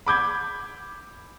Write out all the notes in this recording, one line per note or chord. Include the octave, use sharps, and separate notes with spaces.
B5 D6 G6 G#6